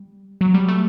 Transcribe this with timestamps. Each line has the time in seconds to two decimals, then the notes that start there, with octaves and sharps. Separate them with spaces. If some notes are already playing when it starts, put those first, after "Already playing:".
Already playing: G3
0.41 F#3
0.54 G3
0.69 A3